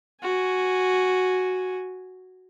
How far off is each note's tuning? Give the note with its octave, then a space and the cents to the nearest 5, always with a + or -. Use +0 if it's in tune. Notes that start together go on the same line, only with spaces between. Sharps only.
F#4 +0 G#5 +0